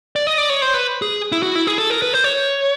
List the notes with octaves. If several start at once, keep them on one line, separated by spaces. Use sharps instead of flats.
D5
D#5
D5
C#5
C5
B4
G#4
E4
F#4
E4
G#4
A4
A#4
B4
C5
C#5